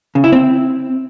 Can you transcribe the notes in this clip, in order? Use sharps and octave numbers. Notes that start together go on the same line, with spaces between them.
C#3
E4
C4